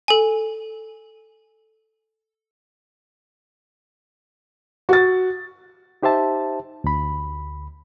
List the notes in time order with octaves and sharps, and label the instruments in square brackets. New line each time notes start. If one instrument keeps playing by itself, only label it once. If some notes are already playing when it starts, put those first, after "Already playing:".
[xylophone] A4 G#5
[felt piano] F#4 A6
[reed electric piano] D#4 G4 C5 E5 A5
D2 B5